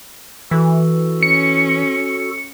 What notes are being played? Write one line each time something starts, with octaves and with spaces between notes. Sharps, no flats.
E3 F#4 A4
C#4 C#7